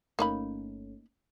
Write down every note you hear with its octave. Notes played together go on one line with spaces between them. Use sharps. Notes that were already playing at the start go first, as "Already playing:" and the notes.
G1 A3 A#3 C#4 D#4 B5